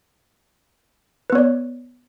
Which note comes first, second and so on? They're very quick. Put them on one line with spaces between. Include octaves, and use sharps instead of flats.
B4 B3 C#5 D5